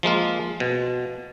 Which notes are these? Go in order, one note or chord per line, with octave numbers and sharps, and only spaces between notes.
F3 G#3 A#3 F4
B2